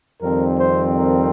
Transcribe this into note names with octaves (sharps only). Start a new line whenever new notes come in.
F2 D#3 G3 C4 A#4
C5
A#4